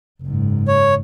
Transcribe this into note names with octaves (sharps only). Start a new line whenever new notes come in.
F#1 G#2
C#5